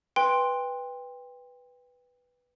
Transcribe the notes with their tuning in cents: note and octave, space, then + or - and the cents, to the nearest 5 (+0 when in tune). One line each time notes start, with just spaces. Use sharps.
B4 +0 G5 +25 C6 +0